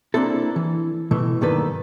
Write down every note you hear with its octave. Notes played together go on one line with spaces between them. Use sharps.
A#3 C4 D4 E4 A4
E3
B2 E3 A3
B1 G2 D#3 A#3 A4 B4